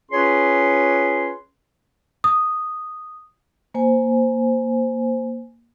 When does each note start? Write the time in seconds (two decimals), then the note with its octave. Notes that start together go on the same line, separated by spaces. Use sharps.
0.11 C#4 F4 G#4 B4 C#5 C6
2.24 D#6
3.74 A#3 C5 G#5